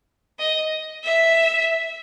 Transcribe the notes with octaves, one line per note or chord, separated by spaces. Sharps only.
D#5
E5